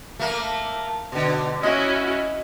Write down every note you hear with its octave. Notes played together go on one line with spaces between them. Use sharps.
A3 A#3
B2 D3
C#4 E4 F#4 D#5